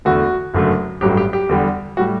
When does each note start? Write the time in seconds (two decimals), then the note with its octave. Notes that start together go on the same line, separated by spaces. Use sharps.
0.05 E2 D3 A3 F#4
0.54 F#1 F#2 D3 F#3 A3
1.01 A1 G2 F#3 A3 G4
1.17 G4
1.33 G4
1.49 E2 D3 G3
1.97 A2 G3 F#4